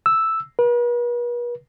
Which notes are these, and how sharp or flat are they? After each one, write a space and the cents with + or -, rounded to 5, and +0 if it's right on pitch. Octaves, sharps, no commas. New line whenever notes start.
E6 +0
B4 -45